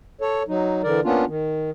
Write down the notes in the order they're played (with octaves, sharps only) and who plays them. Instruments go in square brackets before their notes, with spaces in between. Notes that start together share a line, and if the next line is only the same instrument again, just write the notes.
[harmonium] A4 C#5
F#3 D#4
D3 E3 A#4 D5
A#3 B3 C#4 D4 F4
D#3